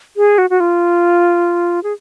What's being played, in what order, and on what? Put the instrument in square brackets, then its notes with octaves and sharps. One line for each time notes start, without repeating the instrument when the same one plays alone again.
[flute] G#4
F#4
F#4
F4
G#4